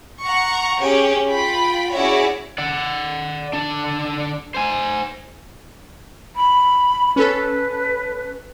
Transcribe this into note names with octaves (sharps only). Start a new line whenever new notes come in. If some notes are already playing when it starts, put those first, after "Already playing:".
F#5 A#5 C#6
C#4 G4 G#4 C#5
F4 G5 B5
C#4 E4 F#4 G#4 C#5 D5
D5 F#5
D3 D4
C5 G#5
B5
C#4 A4 B4